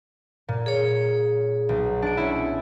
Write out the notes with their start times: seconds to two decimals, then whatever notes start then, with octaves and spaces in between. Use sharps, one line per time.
0.48 A#2
0.66 G#4 C#5
1.69 B1
2.02 D4 D7
2.17 C#4 E4